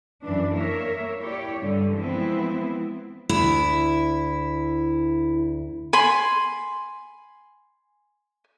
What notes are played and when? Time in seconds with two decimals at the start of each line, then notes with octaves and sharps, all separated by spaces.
0.23 F#2 E3 D4
0.55 A#3 A#4 C#5 E5
1.21 E4 G4 C#5 D5
1.60 G2 D3 G3
1.94 E3 F3 G#3 B3 C4 E4
3.29 D2 E4
5.93 G#5 B5 C6